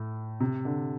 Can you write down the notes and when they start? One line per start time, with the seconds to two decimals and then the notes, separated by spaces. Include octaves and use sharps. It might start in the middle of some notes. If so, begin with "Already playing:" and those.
Already playing: A2
0.40 C3
0.65 D3